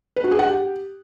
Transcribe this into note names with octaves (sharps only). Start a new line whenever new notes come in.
B4
F#4
G#4
F#5
G4